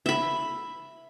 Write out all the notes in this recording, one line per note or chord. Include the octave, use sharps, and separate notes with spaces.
E5 B5